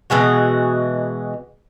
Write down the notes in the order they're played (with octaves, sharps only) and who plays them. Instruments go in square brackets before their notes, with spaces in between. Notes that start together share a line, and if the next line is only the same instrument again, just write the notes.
[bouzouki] B2 E3 G#3 F#4